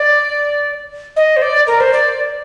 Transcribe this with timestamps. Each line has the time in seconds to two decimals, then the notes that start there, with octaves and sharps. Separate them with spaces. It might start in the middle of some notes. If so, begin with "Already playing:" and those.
Already playing: D5
1.16 D#5
1.36 C5
1.42 D5
1.67 A#4
1.80 C5
1.93 D5